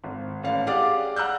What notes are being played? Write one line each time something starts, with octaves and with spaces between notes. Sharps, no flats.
G#1
A1 D4 F5
G4 G#4 D5 F5 F#5 D6
F#5 A#5 E6 F#6 G6